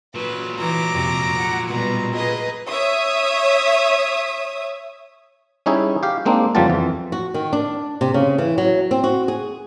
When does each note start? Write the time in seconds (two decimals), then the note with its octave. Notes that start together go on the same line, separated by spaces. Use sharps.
0.15 A#2 F#3 B4
0.59 E3 A#5 D6
0.93 F2 C3
1.38 F#5
1.69 B2 G3 B4 A#5
2.14 G#4 B4 D#5 A#5
2.70 C#5 E5 D#6
5.66 G3 C#4 D#4 E4 G#4
6.03 G4 F5
6.26 G#3 A#3 C4 D4 D#4
6.55 F2 C#3 G3 B3 F4 A5
6.70 F2 E3
7.12 F#4
7.34 D#3
7.53 D4
8.01 C3
8.14 C#3
8.38 E3
8.58 F#3
8.91 C4
9.04 F#4
9.28 G#4